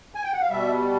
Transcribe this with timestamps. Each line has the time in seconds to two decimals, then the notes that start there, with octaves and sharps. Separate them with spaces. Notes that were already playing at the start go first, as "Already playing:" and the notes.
0.15 G#5
0.24 G5
0.33 F#5
0.41 F5
0.49 B2 G3 E5